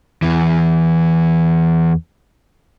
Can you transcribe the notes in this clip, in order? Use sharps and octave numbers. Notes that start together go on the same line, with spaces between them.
E2 E3